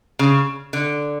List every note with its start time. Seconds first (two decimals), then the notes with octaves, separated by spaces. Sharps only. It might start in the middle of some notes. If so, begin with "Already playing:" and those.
0.19 C#3
0.73 D3